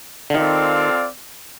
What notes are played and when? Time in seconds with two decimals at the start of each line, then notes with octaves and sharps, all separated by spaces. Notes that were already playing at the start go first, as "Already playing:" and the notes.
0.30 D3
0.34 D#3 C4 F4 A4 D5 F5